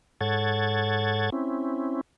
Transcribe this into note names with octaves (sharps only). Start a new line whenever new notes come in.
G#2 A4 C#5 F#5 G#6 A6
C4 C#4 E4